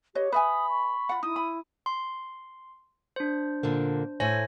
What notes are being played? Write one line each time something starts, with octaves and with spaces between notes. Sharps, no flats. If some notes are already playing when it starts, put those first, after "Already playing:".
G4 B4 C#5 D#5
B4 E5 G#5 B5 D#6
C#6
F4 F#5
D#4 E4 D#6
B5
C6
D4 C5
A#2 D3 A#3
A2 A3 C5 C#5 G#5 A#6